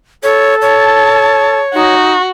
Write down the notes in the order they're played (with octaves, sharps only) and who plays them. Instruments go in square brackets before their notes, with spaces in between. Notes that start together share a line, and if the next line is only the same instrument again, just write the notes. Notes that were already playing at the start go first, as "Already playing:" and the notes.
[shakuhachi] A4 [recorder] C#5
[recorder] C#5 [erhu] A5
[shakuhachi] D#4 [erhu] F#4